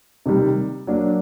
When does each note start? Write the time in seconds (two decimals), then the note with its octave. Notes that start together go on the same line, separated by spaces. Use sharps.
0.26 C3 D#3 G3
0.87 F#3 A#3 D4